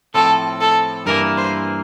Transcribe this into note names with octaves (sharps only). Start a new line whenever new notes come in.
A2 F3 C4 A4
A4
G2 E3 A#3 A#4
C5